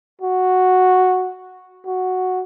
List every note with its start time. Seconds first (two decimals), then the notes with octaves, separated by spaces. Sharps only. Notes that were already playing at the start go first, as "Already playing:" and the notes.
0.21 F#4
1.86 F#4